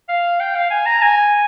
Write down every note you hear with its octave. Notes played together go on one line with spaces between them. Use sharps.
F5
G5
F5
G#5
A#5
G#5